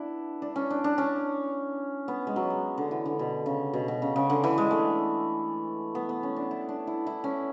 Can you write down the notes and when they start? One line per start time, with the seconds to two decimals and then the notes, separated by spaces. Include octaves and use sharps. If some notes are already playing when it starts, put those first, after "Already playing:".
Already playing: B3 D4 E4
0.42 D4
0.56 C#4
0.70 D4
0.84 D4
0.98 C#4
2.08 B3
2.27 G#3
2.36 F#3
2.50 G#3
2.78 D3
2.91 E3
3.06 D3
3.19 B2
3.46 C#3
3.73 B2
3.88 B2
4.02 C#3
4.16 C#3
4.30 D3
4.44 E3
4.58 G#3
4.71 A3
5.95 B3
6.09 B3
6.23 C#4
6.37 D4
6.51 E4
6.69 D4
6.87 E4
7.07 E4
7.24 C#4